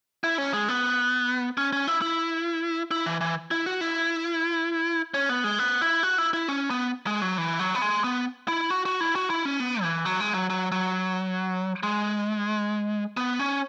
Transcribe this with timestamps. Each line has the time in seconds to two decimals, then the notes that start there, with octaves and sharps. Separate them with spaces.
0.24 E4
0.38 C#4
0.53 G#3
0.68 B3
1.58 C#4
1.73 C#4
1.87 E4
2.02 E4
2.91 E4
3.06 E3
3.21 E3
3.51 E4
3.66 F#4
3.81 E4
5.14 C#4
5.29 B3
5.44 G#3
5.59 B3
5.81 E4
6.03 F#4
6.18 E4
6.33 E4
6.49 C#4
6.70 B3
7.07 G#3
7.22 F#3
7.38 E3
7.59 F#3
7.75 B3
7.82 G#3
8.04 B3
8.48 E4
8.70 F#4
8.86 F#4
9.01 E4
9.16 F#4
9.30 E4
9.45 C#4
9.60 B3
9.83 E3
10.05 F#3
10.20 G#3
10.34 F#3
10.50 F#3
10.72 F#3
11.83 G#3
13.17 B3
13.39 C#4